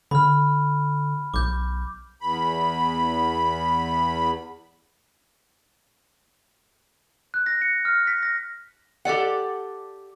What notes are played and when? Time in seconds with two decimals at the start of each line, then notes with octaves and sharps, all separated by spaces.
0.11 D3 B5 F6
1.34 B1 D6 G6
2.21 E2 B5
7.34 F#6
7.46 A#6
7.62 C#7
7.85 F6
8.07 B6
8.23 A#6
9.05 G4 A4 D5 F#5